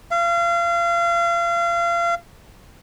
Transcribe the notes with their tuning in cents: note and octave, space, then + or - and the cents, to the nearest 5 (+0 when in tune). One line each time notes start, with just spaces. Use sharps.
F5 -35